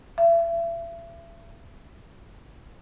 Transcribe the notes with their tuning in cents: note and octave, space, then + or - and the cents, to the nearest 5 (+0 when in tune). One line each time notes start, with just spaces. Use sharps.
E5 +35